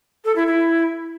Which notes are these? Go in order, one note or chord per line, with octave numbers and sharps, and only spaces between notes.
A4
E4
E4